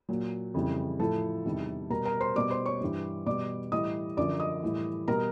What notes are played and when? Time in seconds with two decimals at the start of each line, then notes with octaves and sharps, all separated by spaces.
0.09 A#2 F#3
0.54 F2 C#3 E3 G3
1.00 A2 F3 A4 A5
1.45 E2 C3 D#3 G3
1.90 B2 G3 A#4 A#5
2.05 A#4 A#5
2.20 C5 C6
2.35 B2 G3 D5 D6
2.51 C5 C6
2.66 C#5 C#6
2.81 G2 E3 G3
3.26 B2 G3 D5 D6
3.72 A2 E3 G3 D#5 D#6
4.17 F#2 D3 F3 D5 D6
4.40 D#5 D#6
4.63 A2 E3 G3
5.08 B2 G3 A#4 A#5